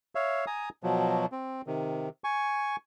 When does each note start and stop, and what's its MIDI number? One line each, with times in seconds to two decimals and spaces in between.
0.15 0.45 73
0.15 0.45 76
0.15 0.45 77
0.47 0.69 80
0.47 0.69 82
0.47 0.69 87
0.83 1.26 47
0.83 1.26 53
0.83 1.26 54
1.32 1.62 60
1.67 2.09 48
1.67 2.09 51
2.24 2.76 80
2.24 2.76 85